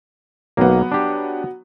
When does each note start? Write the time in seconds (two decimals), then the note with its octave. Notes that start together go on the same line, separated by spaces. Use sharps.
0.57 B1 F#3 A#3 B3
0.92 D4 G4